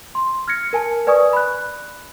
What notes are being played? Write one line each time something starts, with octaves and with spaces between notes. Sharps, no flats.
C6
F6 G#6 A#6 C#7
A#4 G#5 A5
B4 D5 G#5 C#6 D#6
B5 F#6